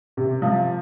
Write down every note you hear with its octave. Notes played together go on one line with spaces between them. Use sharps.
C3
F3